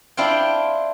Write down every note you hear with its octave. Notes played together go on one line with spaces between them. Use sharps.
D4 E4 F4 C5 G5